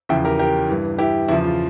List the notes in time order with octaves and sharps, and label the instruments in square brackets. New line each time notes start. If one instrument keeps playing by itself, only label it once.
[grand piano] E2 C#3 F3 E5 G5
G4 A#4
G4 A#4
G2 E3
E4 G4
E2 C#3 F3 E4
F4